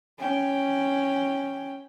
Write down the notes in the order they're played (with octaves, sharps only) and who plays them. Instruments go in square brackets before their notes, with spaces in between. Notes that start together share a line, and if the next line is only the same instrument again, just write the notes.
[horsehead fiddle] C#4 G5